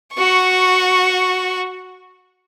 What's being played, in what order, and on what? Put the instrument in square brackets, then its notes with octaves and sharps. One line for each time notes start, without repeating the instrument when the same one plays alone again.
[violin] F#4 C#6